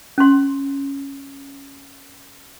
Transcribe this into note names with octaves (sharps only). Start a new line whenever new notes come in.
C#4 C6